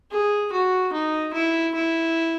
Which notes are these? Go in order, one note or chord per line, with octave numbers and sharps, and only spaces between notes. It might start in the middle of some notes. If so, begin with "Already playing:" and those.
G#4
F#4
D#4
E4
E4